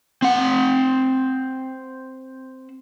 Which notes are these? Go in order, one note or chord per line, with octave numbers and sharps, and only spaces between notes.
C4 F#5